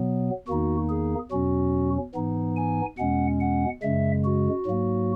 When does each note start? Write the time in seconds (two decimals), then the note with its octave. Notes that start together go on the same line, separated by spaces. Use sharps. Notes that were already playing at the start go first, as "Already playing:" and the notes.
Already playing: B2 F#3 B3
0.47 E2 D#3 A#3 D#4 F#4
0.89 G#4
1.31 E2 B2 F#3 C#4 F#4
2.14 G#2 E3 B3 D#4
2.56 G#5
2.98 E2 B2 G#3 C#4 F#5
3.41 F#5
3.82 F#2 C#3 G#3 E5
4.24 F#4
4.66 G#2 F#3 A#3